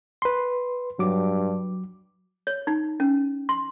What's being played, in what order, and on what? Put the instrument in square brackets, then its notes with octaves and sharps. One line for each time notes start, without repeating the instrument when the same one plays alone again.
[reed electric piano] B4 C6
[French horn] G2 [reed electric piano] F#3 D6
[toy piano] C#5
D#4
C#4
C6